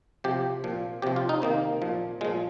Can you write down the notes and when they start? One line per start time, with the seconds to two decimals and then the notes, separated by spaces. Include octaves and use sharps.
0.24 C3 F3 G4
0.64 A#2 F3
1.02 C3 F3 G4
1.16 F4
1.29 D#4
1.42 C3 D#3 A#3
1.82 A#2 F3
2.21 A#2 F3 G#3